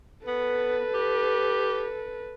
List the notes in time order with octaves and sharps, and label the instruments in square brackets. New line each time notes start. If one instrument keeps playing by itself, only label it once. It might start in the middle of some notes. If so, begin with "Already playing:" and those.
[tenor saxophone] B3 [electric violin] A4 B4
[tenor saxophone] G4